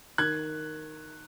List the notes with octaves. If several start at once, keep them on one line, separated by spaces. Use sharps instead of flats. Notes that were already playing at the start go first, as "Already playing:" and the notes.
D#3 F#6 G#6